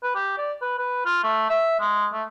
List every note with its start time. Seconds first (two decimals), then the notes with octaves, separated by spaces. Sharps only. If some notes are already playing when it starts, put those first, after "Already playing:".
0.03 B4
0.15 G4
0.37 D5
0.61 B4
0.79 B4
1.05 F4
1.23 A3
1.49 E5
1.80 G#3
2.13 A3